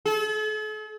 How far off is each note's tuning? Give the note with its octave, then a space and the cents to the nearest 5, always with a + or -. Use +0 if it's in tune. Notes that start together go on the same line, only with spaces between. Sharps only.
A4 -45